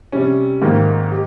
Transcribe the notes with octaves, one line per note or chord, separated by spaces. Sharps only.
C3 G3 C#4
G#2 D#3 A#3
G4